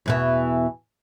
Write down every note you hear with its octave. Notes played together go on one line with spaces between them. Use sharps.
E2 B2 E3